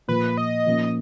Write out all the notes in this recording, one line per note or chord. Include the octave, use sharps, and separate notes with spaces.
A#2 F3 A#3 B4
D#5
A#2 F3 A#3 C#4